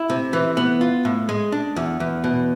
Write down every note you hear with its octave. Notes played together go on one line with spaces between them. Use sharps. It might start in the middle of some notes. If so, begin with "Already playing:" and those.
Already playing: E4
C3
E3
B3
F4
A2
G#3
D4
E2
E2
B2